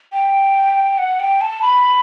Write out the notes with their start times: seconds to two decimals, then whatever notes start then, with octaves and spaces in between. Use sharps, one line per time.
0.13 G5
0.98 F#5
1.20 G5
1.41 A5
1.62 B5